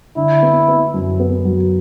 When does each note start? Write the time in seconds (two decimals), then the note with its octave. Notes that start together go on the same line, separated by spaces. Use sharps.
0.16 D3 E4
0.42 B3
0.68 B3
0.94 F#2
1.20 B3
1.45 F#3